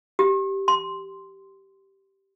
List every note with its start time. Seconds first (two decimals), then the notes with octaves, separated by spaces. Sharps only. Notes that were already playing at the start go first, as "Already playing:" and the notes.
0.19 G4
0.68 C6